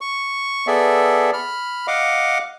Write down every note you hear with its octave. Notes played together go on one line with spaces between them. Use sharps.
C#6
B3 G#4 A4 D5 E5
B5 F6
D#5 F5 F#5 D6